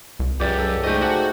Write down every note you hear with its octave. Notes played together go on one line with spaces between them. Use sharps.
C2
C#2 F#2 G4 D5
A4
C#2 G#2 A3 D#5 G5
F#4 F#5 A5 D6